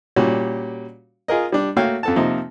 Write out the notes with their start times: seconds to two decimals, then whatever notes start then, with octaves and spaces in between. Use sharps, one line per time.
0.16 A#2 G3 C#4 F#4
1.28 F4 G#4 A#4 D#5
1.52 G3 D4
1.76 A3 A#3 F#4 C#5 F5 G5
2.03 F2 A4 A5
2.16 C3 F3 A#3 D#4